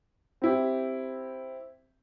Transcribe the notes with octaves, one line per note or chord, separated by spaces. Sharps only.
C4 E4 G4